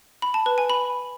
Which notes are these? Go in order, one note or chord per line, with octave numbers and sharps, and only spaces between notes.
B5
A5
B4
G#5
B5